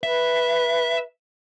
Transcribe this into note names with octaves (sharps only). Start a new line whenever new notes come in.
B4 E5